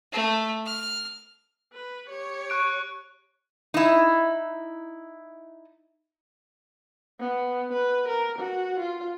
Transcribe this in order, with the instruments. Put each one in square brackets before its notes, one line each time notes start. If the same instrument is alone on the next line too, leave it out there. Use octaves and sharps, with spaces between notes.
[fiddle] A3
F6
[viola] B4
G4 C#5
[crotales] C#6 F#6 D7
[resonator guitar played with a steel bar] D#4 E4
[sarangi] B3
B4
A#4
F#4
F4